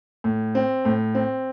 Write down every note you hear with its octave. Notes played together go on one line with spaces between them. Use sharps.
A2
C4
A2
C4